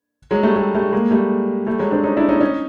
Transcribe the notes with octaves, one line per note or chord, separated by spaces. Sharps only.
F#3 G#3
G3 A3
G3 A3
G3 A3
G#3 A#3
G3 A3
G3 A3
F#3 G#3
C4 D4
C#4 D#4
D4 E4
C#4 D#4
C#4 D#4